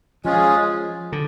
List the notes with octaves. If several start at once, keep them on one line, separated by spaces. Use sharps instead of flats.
F3 G#3 C#4 F4 G#4
D3